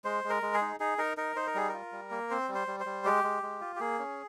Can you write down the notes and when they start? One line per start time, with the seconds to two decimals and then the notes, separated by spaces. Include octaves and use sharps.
0.05 G#3 C5
0.24 G#3
0.30 A#4
0.42 G#3
0.54 G#4
0.61 D#4
0.80 D#4 G#4
0.98 D#4 A#4
1.17 D#4 A#4
1.36 D#4 C5
1.47 A#4
1.55 G3 G#4
1.69 F4 A#4
1.92 G3
2.11 A#3
2.30 C4 C5
2.49 G3
2.55 C5
2.67 G3
2.80 C5
2.86 G3
3.05 G#3 G4
3.24 G#3
3.43 G#3
3.61 F4
3.76 G4
3.80 A#3 G#4
3.99 C#4